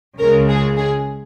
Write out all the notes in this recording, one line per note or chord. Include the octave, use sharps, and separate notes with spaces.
C#2 C#3 G#3 A#4
G#4
G#4